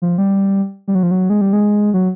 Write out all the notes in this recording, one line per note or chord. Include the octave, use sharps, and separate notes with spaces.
F3
G3
G3
F#3
F3
F#3
G#3
G3
G#3
F#3